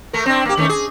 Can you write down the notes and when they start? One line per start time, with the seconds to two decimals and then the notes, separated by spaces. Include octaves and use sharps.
0.13 A3 A#4
0.26 C4 D4
0.45 A#3 G4
0.57 D#3 A3 C#4
0.69 G#4